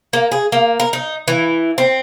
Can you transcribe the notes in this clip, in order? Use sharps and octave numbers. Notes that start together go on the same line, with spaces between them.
A#3
G#4
A#3
A#4
D#4
E3
C4